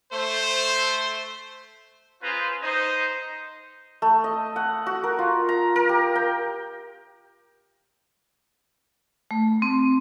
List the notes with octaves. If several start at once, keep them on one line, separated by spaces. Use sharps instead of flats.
A3 C5
C#4 F4 G#4 B4 C5 A#5
D#4 C5 D#5
A3
D#5
F#5
F#4
A#4
F4
A#5
A#4
G4
G5
A3
C4